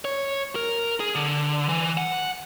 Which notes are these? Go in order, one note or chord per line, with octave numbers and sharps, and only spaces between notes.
C#5
A#4
G#4
D3
E3
F#5